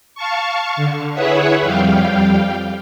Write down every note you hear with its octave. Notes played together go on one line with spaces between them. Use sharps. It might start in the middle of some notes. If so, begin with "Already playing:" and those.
F5 A5 C#6
D3
E4 G#4 B4 C#5 E5 F#5
F2 G3 F5 G5